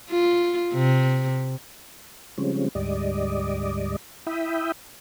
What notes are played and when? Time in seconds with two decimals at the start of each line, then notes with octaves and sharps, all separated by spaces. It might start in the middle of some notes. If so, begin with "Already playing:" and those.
0.10 F4
0.74 C3
2.38 C#3 F3 G3 G#3 C4 C#4
2.75 D2 G#2 G3 D5 D#5
4.27 E4 E5 G5 B5 D#6